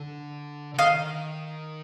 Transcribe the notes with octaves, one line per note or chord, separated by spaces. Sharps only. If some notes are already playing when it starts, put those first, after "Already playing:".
Already playing: D3
D3
D#3 D#5 F5